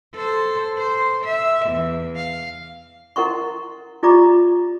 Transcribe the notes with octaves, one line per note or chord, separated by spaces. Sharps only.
A4 C5
C5
E5
E2
F5
E4 A#4 F#5 C6 C#6
E4 F4 G4 D5 A#5 D6